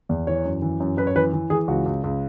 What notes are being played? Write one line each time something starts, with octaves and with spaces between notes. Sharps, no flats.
E2
E3 C#5
F#2
E3
F#2
F#2 B4
C#5
E3 B4
E3
E3 G#4
C#2 F#4
C#2
C#2